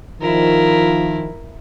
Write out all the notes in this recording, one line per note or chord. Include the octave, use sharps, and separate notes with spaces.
D#3 F3 E4 F4 A#4